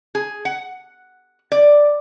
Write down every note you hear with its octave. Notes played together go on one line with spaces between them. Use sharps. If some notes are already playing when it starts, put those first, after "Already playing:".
G#4
F#5
D5